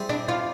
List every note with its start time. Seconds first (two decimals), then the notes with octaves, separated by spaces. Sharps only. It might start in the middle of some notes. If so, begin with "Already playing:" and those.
Already playing: G3 C4 E4 G#4
0.09 D4
0.28 F4